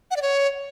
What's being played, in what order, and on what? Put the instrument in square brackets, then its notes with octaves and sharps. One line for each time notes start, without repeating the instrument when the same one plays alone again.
[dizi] F#5
D5
C#5